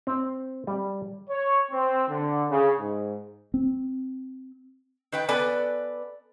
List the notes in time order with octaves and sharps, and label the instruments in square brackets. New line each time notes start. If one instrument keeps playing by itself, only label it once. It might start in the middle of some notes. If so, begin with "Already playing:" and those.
[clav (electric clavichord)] C4
G3
[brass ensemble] C#5
C4
D3
C#3
G#2
[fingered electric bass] C4
[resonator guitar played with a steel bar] D#3 B4 G5
B3 A4 B4 D5 G#5